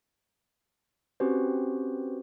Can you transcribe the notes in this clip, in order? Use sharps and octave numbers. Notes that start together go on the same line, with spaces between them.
C4 C#4 F#4 G4 B4 C5